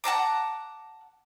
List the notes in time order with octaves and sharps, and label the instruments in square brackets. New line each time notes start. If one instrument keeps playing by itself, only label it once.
[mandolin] F#5 A5 A#5 D6